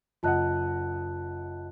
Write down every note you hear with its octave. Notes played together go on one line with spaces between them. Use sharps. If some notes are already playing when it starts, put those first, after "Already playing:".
F#1 F4 D#5 F#5 A5 F#6